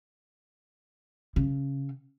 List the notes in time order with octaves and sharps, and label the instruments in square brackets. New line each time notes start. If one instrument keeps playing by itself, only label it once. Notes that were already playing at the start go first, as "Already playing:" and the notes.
[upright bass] C#3